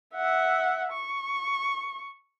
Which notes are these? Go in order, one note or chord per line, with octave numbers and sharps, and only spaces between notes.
E5 F#5
C#6